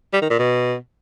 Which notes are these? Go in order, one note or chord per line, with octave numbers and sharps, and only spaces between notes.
G3
D#3
A#2
B2